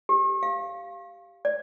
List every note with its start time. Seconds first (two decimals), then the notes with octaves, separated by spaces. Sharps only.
0.09 G4
0.43 F5
1.45 D5